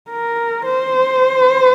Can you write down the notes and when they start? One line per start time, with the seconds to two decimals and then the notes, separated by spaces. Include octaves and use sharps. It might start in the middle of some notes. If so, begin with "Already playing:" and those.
0.10 A#4
0.65 C5